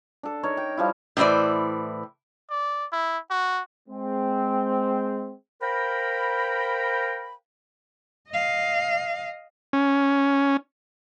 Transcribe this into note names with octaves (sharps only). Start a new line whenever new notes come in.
D4 A4
D#4 A#4 C#5
G5
F3 G3 E4
A2 E3 C4 C5 D5
D5
E4
F#4
G#3 C4
A#4 C5 F5 G5 A#5 B5
D#5 F5
C#4